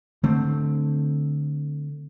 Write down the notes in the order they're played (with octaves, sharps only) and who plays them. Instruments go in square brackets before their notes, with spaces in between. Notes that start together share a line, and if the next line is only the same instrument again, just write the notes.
[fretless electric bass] D3 A3 C4